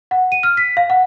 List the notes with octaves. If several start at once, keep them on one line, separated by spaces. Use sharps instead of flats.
F#5
D#7
F6
B6
F5
F#5